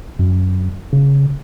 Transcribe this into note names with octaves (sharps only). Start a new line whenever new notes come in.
F#2
C#3